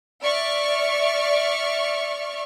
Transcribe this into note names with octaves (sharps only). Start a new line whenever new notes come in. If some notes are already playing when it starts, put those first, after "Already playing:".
D5 E5 C#6 F6